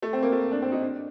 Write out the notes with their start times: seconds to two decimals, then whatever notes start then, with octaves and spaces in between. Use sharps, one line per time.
0.02 A3
0.13 C4
0.22 A#3
0.32 A3
0.52 D4
0.62 C4
0.72 D#4
0.82 D4